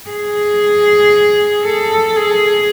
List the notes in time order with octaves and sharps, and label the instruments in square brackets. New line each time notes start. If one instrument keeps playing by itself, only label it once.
[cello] G#4
A4
G#4